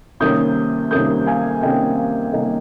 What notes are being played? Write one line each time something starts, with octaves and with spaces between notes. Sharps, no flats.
C2 C3 D#3 A#3 C#4 D#6 G6
C2 C3 D#3 A#3 C#4 D#6 G6
F5 G#5
C2 C3 D#3 A#3 C#4 D#5 G5
F5
F5
C2 C3 D#3 A#3 C#4 D#5